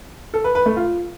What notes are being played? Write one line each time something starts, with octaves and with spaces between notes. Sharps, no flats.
A4
B4
B4
A3
F4